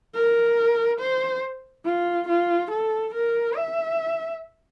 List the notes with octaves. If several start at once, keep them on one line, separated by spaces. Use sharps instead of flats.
A#4
C5
F4
F4
A4
A#4
E5